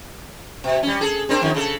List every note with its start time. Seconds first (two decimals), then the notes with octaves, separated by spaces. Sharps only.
0.64 B2
0.83 G3 C#4
1.01 G#4 A4
1.29 C4 D4 A#4
1.42 F2 D#3
1.54 C#3 D4 A4